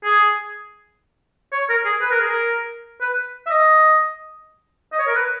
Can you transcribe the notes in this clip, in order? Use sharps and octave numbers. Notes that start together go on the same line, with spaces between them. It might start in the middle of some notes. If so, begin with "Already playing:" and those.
G#4
C#5
A#4
G#4
B4
A#4
G#4
A#4
B4
E5
D#5
D#5
C#5
A#4
B4